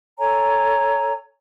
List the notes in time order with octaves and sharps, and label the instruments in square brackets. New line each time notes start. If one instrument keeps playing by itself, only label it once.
[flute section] A4 C#5 G#5 A#5